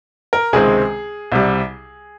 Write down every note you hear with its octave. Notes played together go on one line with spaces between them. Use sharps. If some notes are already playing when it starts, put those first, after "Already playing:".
A#4
C#2 C3 D#3 G#3 C4 G#4
C2 C3 G3